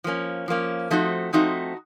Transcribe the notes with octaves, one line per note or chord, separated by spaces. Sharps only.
F3 A#3 C#4
F3 A#3 C#4
F3 A3 C4 D#4 F#4
F3 A3 C4 D#4 F#4